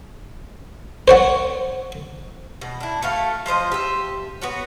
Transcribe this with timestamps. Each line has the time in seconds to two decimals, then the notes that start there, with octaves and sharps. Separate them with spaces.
1.08 C5 C#5 F#5
2.61 B2
2.80 D4 E4
3.02 A3 F#4 F5
3.46 F3 F4 C5 D#5
3.72 G4 E5
4.41 B3 F#4 C#5